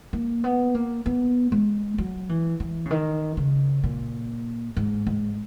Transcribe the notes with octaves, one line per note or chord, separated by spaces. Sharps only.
A#3
B3
A#3
B3
G#3
F#3
E3
E3
C#3
D#3
C#3
A#2
G#2
G#2